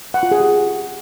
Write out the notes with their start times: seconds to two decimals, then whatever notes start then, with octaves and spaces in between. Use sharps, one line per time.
0.14 F#5
0.23 F4
0.31 G#4
0.40 G4